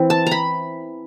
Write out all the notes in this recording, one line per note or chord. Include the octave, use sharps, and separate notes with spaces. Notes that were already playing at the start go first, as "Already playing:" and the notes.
Already playing: E3 C4
A5
A#5 B5